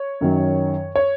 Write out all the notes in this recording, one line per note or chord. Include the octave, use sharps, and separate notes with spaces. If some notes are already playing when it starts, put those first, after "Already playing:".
Already playing: C#5
F#2 D#3 F#3
C#5